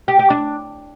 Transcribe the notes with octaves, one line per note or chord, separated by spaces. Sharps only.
G4
G4
D4